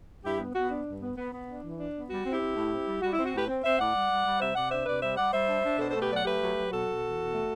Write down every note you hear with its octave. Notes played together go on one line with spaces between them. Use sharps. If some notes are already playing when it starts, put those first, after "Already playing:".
G2 E4 G4
B3
B3 F#4
D4
G2
B3
B3
B3
D4
E3
D4
B3
G3 F#4
C4
E4 G4
C4
A2
C4
G3
G3 F#4
C4 E4
F#4
A2 G4 B4
C4
C4 C5 E5
A2 D5 F#5
G3
G3
G3
C3 C5 E5
C3 D5 F#5
D4 C5 E5
C3 B4 D5
G3 C5 E5
G3 D5 F#5
G3 C5 E5
D4
D4
B2 A4 C5
A3 A4 C5
G4 B4
F#3 D5 F#5
A3 G4 B4
F#3
F#3
B2 F#4 A4
B2
E2
B2
A3